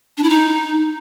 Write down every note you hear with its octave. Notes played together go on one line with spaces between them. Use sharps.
D4
E4
D#4